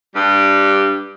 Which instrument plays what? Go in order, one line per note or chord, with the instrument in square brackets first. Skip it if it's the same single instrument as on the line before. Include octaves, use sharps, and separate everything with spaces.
[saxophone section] G2 G3 G4